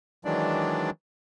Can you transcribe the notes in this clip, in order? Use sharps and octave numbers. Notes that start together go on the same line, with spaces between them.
D#3 E3 F#3 G#3 D4 D5